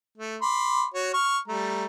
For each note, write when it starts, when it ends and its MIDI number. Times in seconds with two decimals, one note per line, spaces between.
0.18 0.37 57
0.42 0.85 83
0.42 0.85 84
0.42 0.85 86
0.94 1.12 66
0.94 1.12 73
1.14 1.39 85
1.14 1.39 89
1.48 1.86 55
1.48 1.86 57
1.48 1.86 82